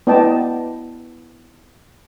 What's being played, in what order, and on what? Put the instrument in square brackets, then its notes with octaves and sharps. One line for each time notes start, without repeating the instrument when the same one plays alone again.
[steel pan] B3 E4 D5 D#5 G5 A5